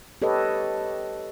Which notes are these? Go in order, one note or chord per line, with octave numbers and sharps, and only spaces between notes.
G4 A4 B4 C#5 D#5